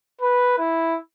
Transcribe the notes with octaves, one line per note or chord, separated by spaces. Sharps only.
B4
E4